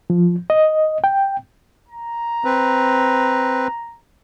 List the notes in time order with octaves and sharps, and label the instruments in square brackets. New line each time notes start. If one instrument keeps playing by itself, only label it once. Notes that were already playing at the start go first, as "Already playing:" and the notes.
[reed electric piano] F3
D#5
G5
[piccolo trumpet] A#5
[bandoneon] C4 B4